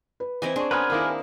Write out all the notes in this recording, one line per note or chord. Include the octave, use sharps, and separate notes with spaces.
B4
E3 C4 E4 D#5 G#5
D4 G#4 C6 C#6
B3 C#4 G#4 A#4 B4 G#5 A#5 C6
D#3 A#3 E4 F5 A#5 D6